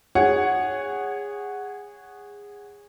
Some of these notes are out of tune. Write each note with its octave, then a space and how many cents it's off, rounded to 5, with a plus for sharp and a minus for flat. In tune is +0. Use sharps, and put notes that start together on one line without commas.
G#4 -20 C#5 +0 F#5 +0